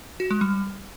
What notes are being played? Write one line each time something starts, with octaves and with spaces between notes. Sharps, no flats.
F#4
G#3
G3